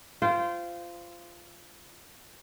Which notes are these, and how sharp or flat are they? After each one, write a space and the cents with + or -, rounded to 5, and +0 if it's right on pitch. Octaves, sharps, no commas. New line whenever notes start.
F4 -15 C5 -20 G5 -15